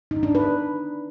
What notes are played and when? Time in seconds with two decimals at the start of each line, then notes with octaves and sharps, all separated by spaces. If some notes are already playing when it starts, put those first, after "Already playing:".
0.11 D#4
0.23 D4
0.35 B4